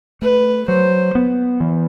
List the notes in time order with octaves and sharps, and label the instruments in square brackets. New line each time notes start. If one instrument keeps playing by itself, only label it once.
[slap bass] A3 [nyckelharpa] B4
[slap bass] F#3 [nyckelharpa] C5
[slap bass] B3
E3